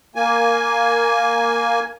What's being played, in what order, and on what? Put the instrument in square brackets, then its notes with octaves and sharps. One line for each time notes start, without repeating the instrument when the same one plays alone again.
[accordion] A#3 G#5